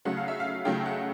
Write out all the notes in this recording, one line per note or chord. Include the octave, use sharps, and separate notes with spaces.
C#3 F#3 A3 F#5
F5
E5
F5
C#3 F#3 A3 G5
F#5